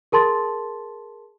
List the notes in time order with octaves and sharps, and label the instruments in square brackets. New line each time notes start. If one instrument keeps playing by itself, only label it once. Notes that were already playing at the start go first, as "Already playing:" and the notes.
[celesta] G#4 A#4 A5 C6 A6